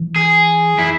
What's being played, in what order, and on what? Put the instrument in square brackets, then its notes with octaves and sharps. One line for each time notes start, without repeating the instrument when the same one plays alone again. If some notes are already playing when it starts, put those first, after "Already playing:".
Already playing: [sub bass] E3
[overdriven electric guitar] G#4
E4